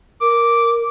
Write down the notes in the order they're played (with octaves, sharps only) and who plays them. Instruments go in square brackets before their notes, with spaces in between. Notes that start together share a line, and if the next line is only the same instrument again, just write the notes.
[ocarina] A#4 [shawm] D6